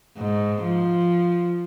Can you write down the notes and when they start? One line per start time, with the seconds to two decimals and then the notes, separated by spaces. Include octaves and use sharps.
0.18 G#2
0.63 F3